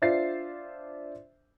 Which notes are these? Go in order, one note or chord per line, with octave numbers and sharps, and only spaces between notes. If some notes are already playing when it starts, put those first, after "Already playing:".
D4 F4 C5 E5 A6 C7